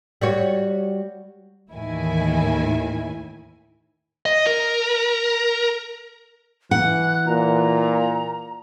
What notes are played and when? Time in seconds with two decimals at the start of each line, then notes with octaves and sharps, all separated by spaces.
0.21 G3 F#4 C#5
1.71 D#2 A2 D#3 E3 E4 G#5
4.26 D#5
4.47 A#4
6.71 E3 F#5 F#6
7.27 A#2 A#5